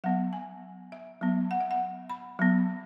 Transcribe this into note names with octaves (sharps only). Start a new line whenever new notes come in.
F#3 B3 F#5
G#5
E5
F#3 B3
F#5
E5
F#5
B5
F#3 B3